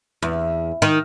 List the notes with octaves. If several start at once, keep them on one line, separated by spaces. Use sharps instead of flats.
E2
D#3